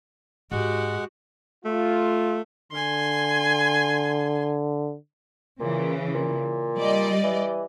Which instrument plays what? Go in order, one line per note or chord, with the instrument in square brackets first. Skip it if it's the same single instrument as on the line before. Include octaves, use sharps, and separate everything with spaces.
[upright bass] G#2 [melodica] G#3 F#5 [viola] F#4 G4
[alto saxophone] A3 [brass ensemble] F4
[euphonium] D3 [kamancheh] G#5 C6
[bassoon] A#2 [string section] C#3 E3
[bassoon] A#2
[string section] G3 D5 D#5
[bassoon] E3